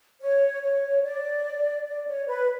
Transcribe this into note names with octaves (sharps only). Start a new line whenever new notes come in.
C#5
C#5
D5
D5
C#5
B4